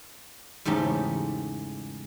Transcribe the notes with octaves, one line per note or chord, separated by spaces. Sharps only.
E2 G#2 C#3 A3 G4